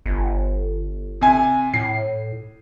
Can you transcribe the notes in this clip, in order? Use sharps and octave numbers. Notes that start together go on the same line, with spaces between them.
G1
C3 G#5
A2 C7